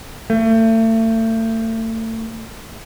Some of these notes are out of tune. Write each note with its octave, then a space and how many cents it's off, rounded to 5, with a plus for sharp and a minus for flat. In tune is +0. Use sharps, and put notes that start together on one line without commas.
A3 +35